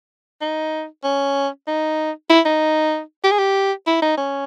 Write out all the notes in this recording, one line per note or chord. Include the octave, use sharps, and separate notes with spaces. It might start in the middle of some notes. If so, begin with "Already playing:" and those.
D#4
C#4
D#4
E4
D#4
G4
G#4
G4
E4
D#4
C#4